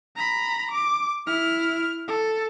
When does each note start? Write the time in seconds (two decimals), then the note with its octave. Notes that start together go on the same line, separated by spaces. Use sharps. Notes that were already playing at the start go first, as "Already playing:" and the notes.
0.16 A#5 B5
0.71 D6
1.27 E4 F6
2.08 A4